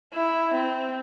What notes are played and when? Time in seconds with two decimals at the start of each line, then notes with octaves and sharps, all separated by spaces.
0.14 E4
0.55 C4